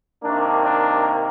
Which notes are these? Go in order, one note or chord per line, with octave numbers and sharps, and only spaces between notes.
C3 D#3 A#3 D4
D4